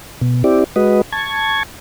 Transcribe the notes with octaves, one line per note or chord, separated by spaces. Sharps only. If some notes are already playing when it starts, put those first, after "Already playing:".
B2
C4 E4 G4 D5
G#3 F#4 B4 D#5
A5 C#6 G#6